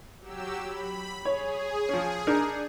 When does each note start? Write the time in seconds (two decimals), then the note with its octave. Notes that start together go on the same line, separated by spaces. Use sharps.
0.20 F#3 G4 E6
0.64 B5
1.25 G#4 C#5
1.89 F3 C#4
2.27 D4 D#4 A#4